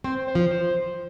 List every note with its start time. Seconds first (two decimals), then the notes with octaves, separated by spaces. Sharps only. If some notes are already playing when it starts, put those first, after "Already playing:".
0.04 C4 C5
0.28 C5
0.35 F3
0.51 C5